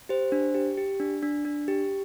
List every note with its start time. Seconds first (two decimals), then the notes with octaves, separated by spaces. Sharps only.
0.09 G4 C5
0.32 D4
0.54 G4
0.77 G4
1.00 D4
1.23 D4
1.45 D4
1.68 G4